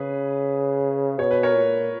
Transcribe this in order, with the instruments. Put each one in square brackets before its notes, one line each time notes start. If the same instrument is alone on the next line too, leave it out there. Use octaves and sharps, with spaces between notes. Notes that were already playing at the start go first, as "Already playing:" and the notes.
Already playing: [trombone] C#3 [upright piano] G#4 B4
[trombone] B2 [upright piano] C#5
[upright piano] B4
A#4 C#5
[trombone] A#2